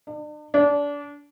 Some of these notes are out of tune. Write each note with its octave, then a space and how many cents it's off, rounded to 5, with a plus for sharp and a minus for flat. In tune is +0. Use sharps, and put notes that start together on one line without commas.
D4 +40
D4 -25